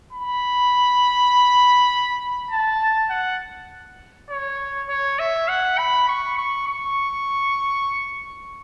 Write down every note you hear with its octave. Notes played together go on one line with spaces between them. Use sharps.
B5
A5
F#5
C#5
C#5
E5
F#5
B5
C#6
C#6
C#6